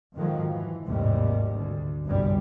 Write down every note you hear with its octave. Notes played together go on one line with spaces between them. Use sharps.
F2 G#2 D#3 F3 F#3
E3
G#1 D#2 A2 C3 G3
D2
G1 C2 F#2 G3